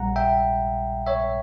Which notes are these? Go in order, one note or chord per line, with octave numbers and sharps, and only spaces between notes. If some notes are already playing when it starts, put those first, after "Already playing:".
Already playing: A#1 A#2 G3 F#5 A#5
E5 G5
C#5 E5